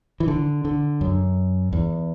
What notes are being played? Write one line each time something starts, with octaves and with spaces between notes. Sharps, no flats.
E3
D3
D3
F#2
E2